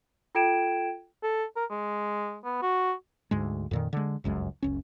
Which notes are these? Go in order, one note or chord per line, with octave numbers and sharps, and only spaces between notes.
F4 A4 G5 G#6 D7 E7
A4
A#4
G#3
B3
F#4
D2 G#2 G#3
F2 A#2 D#3
D3 G#3
G1 C#2 F#2 G#3
F#1 C#2 C#4